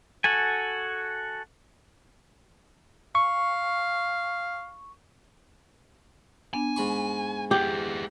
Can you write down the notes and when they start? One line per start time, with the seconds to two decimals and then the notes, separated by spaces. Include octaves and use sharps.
0.24 F#4 A4 G#5
3.15 F5 C#6
6.54 B3 D4 G#5
6.76 G#2 B5 C#6
7.51 E4 G4 G#4